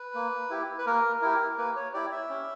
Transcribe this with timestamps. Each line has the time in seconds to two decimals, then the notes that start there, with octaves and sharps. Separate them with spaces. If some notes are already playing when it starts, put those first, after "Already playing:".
Already playing: B4
0.15 A#3
0.50 E4 G4
0.78 B4
0.86 A#3 A#4
1.22 E4 G4 A#4
1.58 A#3 B4
1.76 C#5
1.93 E4 G4 D5
2.12 E5
2.29 C#4